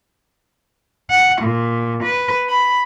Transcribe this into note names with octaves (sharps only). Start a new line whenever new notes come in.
F#5
A#2
B4
B5